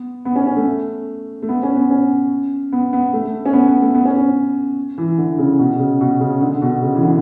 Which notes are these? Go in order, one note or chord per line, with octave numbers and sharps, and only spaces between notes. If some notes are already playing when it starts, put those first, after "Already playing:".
Already playing: B3
B3
C#4
C#4
A3
A3
B3
C#4
B3
C#4
B3
B3
A3
A3
C#4
B3
B3
A3
B3
C#4
C#4
E3
D3
C#3
B2
C#3
B2
C#3
D3
B2
C#3
E3
D3